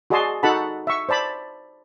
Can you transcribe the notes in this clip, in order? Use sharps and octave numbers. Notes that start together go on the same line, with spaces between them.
F#4 G#4 D5 D#5 A5 C6
D#4 F#4 A4 F#5 A5 B5
E5 C#6
C5 D5 A5 B5